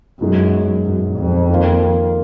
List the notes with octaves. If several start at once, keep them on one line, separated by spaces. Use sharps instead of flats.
F#2 B2 G#3 D#4 G#4
F#2
F2
D#3 A#3 F4